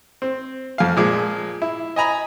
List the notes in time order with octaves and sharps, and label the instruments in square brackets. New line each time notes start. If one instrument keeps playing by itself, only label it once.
[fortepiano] C4
F2 F5
A#2 F3 G#3 D6
E4
D#5 G#5 A#5 B5